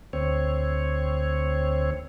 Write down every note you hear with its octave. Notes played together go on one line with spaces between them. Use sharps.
D2 C4 C#5